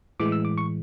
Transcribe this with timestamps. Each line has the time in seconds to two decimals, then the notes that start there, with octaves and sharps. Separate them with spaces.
0.20 A2 E3 G#3 D6
0.32 E6
0.45 D6
0.58 C#6